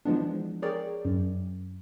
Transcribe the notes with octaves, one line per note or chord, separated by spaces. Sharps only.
E3 F3 G#3 B3 D4
G#4 A#4 C#5 D5 G5
F#2